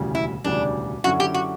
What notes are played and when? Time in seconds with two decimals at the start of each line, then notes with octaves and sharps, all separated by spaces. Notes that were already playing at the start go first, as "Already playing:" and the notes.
Already playing: E1 D2 C#3 E3 G3
0.15 E4
0.44 E1 D2 C#3 E3 G3 D4
1.04 F#2 D3 F#3 C#4 E4 F#4
1.20 G4
1.34 F#4